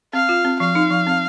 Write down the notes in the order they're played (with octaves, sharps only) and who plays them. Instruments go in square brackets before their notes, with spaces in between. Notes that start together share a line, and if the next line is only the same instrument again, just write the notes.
[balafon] C4 [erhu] F5
[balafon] F4
C4
[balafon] F3 [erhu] F5
[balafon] D#4
F3
C4